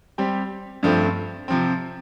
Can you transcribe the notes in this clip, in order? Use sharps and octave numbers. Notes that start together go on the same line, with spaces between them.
G3 C4 G4
G2 F3 A3 C4
C3 F3 C4